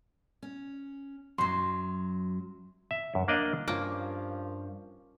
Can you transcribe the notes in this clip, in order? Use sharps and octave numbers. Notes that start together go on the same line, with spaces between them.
C#4
F#2 F#3 C6
E5
F#2
A#3 D4 D5 D#5 F5
G2 F3 A#3 C#4 F4 G4